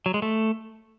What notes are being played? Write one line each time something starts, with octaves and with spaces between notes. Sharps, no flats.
F#3
G#3
A3